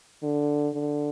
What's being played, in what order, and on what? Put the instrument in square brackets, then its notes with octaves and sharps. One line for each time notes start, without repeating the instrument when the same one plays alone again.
[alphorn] D3
D3